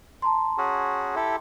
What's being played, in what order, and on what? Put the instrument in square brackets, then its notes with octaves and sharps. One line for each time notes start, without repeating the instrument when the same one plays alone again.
[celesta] A5 A#5 C6
[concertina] C#4 F#4 G#4
E4 G4 A4